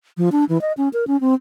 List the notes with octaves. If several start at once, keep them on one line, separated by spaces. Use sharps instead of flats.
F3
D4
E3
D#5
C#4
A#4
C#4
C4